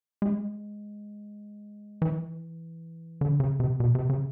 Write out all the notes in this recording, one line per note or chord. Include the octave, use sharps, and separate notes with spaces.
G#3
E3
D3
C#3
C3
B2
C3
C#3